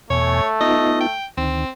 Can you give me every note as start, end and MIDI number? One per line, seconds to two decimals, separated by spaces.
0.10 0.41 40
0.10 0.41 47
0.10 1.16 57
0.10 0.46 73
0.10 0.41 80
0.61 1.07 59
0.61 1.07 63
0.61 1.07 65
0.61 1.00 75
1.01 1.26 79
1.37 1.65 38
1.37 1.65 51
1.37 1.69 60